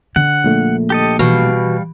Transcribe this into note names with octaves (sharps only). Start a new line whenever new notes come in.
D3 F#5
A#1 A#2 A3
G4 A4 D#5
B2 E3 G3 F5